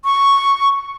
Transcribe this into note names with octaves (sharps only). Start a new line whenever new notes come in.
C#6